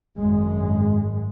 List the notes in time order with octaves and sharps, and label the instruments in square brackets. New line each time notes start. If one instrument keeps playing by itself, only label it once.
[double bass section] G#1 F#2 G#3